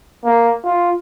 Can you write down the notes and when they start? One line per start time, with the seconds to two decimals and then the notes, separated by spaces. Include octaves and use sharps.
0.25 A#3
0.64 F4